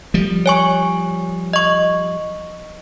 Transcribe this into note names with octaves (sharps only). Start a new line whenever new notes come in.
F3 G3
C#5 G#5 C#6
D#5 C#6